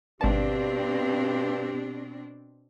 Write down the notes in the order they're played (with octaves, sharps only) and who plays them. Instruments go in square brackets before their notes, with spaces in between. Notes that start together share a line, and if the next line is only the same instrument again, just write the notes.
[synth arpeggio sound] G#1 A5 [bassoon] G2 [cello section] B2 C4 D4 [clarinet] G4